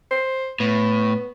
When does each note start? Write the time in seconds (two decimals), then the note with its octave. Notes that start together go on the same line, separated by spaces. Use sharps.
0.11 C5
0.60 A2 B3